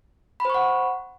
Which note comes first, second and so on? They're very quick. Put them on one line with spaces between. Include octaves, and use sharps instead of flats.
B5 C5 C#6 F#5